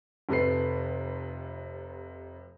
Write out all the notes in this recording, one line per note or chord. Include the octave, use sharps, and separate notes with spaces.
F1 C3 A4 B4 C7